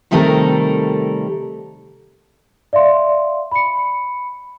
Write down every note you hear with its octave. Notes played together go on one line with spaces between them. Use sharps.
C3 D#3 G3 A3 A4 A#4
D5 E5 F5 C6
B5 C#7